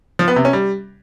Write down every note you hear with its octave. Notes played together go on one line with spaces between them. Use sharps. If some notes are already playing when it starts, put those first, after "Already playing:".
F3
B3
C3
C#4
G3